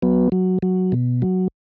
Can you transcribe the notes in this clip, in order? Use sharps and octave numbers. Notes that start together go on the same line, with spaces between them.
F#3 B3
F#3
F#3
B2
F#3